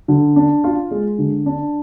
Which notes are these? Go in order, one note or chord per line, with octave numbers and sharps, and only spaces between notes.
D3
D4
F4
G#3
D3
D4